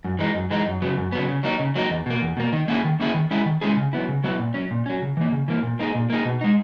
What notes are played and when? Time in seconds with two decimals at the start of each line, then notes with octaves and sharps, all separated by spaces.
0.04 F#2
0.19 E3 G#3 D#4
0.35 F#2
0.51 E3 G#3 D#4
0.67 F#2
0.82 C#3 F#3 B3
0.97 F#2
1.12 C#3 F#3 B3
1.28 C#3
1.43 F#3 A#3 D#4
1.60 C#3
1.76 F#3 A#3 D#4
1.90 E2
2.06 B2 A#3
2.22 E2
2.37 B2 A#3
2.53 D#3
2.68 A#3 C#4 E4 G#4
2.84 D#3
3.00 A#3 C#4 E4 G#4
3.14 D#3
3.31 G#3 C#4 E4 G#4
3.46 D#3
3.61 G#3 C#4 E4 G#4
3.77 C#3
3.93 F#3 B3 E4
4.08 C#3
4.24 F#3 B3 E4
4.39 A#2
4.54 F#3 C#4
4.71 A#2
4.86 F#3 C#4
5.02 C#3
5.17 E3 A#3
5.32 C#3
5.48 E3 A#3
5.63 A#2
5.79 A#3 D#4 G#4
5.95 A#2
6.10 A#3 D#4 G#4
6.25 B2
6.41 G#3 D#4